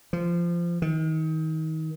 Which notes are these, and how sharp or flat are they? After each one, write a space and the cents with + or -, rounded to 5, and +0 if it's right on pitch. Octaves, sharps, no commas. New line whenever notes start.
F3 -20
D#3 +30